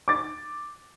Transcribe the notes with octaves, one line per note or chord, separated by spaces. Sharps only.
D6 A6